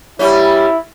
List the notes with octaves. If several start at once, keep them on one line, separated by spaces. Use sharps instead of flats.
G3 C#4 E4